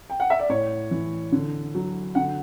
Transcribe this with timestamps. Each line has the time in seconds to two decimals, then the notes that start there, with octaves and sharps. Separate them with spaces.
0.10 G5
0.20 F#5
0.30 E5
0.39 D5
0.49 A2 C#5
0.91 E3
1.32 D3
1.75 F#3
2.15 D3 F#5